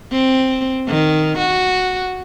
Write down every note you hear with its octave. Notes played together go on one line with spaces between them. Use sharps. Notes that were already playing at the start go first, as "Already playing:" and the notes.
C4
D#3
F#4